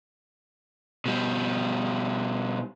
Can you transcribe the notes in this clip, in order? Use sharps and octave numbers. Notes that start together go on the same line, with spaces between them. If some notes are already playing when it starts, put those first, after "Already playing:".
B2 G3